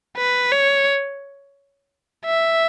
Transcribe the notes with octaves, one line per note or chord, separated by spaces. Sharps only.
B4
C#5
E5